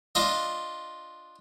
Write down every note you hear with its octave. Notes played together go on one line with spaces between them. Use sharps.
D4 F4 D#5